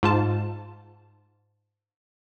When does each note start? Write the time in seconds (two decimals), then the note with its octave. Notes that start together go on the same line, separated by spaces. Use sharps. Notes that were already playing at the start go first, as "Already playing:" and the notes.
0.03 G#2 F4 A5